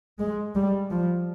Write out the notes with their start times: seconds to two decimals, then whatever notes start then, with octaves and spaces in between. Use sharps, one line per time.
0.19 G#3
0.55 G3
0.91 F3